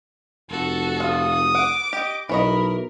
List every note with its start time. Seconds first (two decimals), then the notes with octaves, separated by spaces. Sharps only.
0.50 F1 F#4 A4
1.00 F4 D#6
1.55 F#5 D6
1.93 G4 D#5
2.29 B1 E3 A#4 C#5 D#5 B5